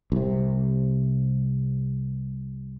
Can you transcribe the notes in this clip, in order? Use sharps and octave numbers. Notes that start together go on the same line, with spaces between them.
C2 C3